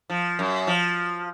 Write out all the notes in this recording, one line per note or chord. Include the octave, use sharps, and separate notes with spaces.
F3
F#2
F3